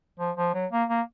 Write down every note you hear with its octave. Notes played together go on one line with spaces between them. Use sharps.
F3
F3
F#3
A#3
A#3